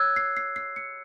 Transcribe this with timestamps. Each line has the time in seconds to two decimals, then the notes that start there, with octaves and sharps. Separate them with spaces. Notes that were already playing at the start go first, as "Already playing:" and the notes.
Already playing: C#5 E6 F#6 G#6
0.16 C7
0.37 C7
0.56 C7
0.76 C#7